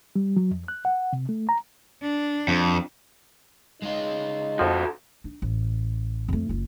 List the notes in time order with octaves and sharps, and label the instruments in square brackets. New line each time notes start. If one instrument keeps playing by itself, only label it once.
[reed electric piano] G3
F#3
F2
F#6
F#5
C3
A3
A#5
[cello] D4
[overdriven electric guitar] F2
[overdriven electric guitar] G#3 F4 [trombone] D#4
[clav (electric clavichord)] F2 F3 [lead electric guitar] F#4 A4
[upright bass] D4
A1
F2 A3
F#1 F4